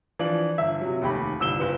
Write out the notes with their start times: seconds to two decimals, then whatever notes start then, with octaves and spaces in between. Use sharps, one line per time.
0.19 E3 F3 D4 F#7
0.58 G1 E5
0.81 C3 F#3
1.01 F1 D#2 G4 B5
1.40 G1 C2 E6 E7 G7
1.60 F#1 B4